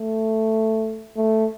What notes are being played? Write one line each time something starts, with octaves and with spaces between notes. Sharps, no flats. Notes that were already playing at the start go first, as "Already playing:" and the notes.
Already playing: A3
A3